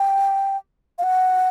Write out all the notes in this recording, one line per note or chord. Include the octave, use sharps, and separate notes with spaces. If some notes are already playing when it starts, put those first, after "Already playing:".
Already playing: G5
F5
F#5